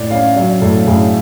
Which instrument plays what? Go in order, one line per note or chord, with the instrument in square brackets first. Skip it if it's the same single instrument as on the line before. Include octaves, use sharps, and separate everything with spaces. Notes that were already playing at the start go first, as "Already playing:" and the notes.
Already playing: [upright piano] A2 D5
C#4 F5
F#3 C#5
A2 A4
A2 G#4